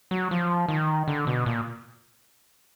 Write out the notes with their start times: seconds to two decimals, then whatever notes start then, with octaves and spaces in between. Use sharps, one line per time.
0.11 F#3
0.31 F3
0.69 D#3
1.08 D3
1.27 B2
1.46 A#2